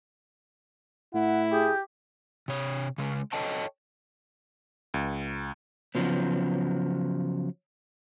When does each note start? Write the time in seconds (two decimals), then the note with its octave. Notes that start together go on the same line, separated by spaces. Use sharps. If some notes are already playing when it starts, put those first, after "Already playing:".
1.14 A2 E4 F#5
1.53 G4 G#4
2.48 C3 C#5
2.98 C#3 G#3
3.33 A4 C#5 D#5 G5 A5
4.94 C#2
5.95 C#3 F3 F#3 B3